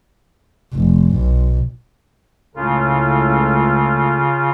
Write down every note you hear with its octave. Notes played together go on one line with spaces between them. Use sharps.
F1
B1
C#2 A2 C#3 F4 A4